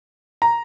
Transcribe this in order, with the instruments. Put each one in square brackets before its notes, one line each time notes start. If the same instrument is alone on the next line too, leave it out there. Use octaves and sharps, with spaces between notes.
[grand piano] A#5